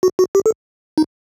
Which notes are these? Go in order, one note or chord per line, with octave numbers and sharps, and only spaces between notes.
F#4
F#4
G4
A4
D#4